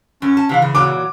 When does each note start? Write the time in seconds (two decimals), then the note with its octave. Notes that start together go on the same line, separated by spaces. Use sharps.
0.22 F#2 C#4
0.37 A5
0.49 C3 E3 F5
0.62 C#3 E3
0.75 A#2 E3 F#3 D6